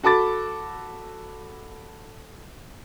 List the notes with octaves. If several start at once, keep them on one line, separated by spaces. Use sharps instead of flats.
F#4 A4 B5 D6 A6